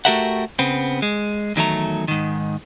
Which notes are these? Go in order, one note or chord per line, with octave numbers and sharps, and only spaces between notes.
A3 F#4 G4 A#4 E5 F#5
C#3 B3 C4
G#3
E2 D#3 F#3 A3 A#5
G#2 D#3